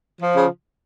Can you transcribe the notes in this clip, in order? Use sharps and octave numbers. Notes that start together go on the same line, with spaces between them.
F3
C#3